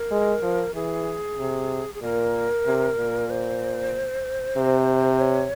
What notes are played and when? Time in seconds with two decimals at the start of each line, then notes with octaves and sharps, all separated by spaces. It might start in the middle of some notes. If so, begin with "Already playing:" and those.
Already playing: A#4
0.11 G#3
0.42 F3
0.75 E3 G#4
1.38 C3
1.95 G#4
2.02 A#2 A#4
2.66 C3
2.97 A#2
3.30 C5
4.57 C3
5.21 C#5